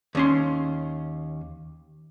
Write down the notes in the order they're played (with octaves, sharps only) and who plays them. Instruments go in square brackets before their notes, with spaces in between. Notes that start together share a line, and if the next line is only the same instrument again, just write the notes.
[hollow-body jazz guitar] D#2 C#4 C6